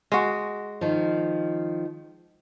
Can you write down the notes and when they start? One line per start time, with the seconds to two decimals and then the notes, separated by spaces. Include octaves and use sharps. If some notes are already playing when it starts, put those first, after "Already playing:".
0.12 G#3 F#4
0.81 D#3 F3